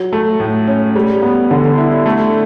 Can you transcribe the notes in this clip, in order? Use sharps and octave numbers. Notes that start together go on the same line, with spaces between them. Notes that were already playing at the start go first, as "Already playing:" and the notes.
Already playing: F#3
A3
A2
C#4
G3
B3
D3
E4
A3